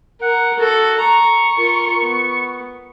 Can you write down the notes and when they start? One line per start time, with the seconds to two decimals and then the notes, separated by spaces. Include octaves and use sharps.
0.22 A#4 F#5
0.59 F#4 A4
1.00 A#5 C#6
1.57 F4 A#4
2.02 B3